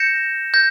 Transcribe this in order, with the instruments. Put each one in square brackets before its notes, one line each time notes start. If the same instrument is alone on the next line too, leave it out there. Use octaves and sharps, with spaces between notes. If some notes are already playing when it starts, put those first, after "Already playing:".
Already playing: [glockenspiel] G6 A#6 C#7 E7
G6 A#6